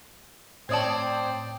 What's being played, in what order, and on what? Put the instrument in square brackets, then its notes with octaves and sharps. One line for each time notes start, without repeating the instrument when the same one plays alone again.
[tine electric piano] A2 [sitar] C4 C#5 D5 [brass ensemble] G5 [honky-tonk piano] A5 D#6 G#6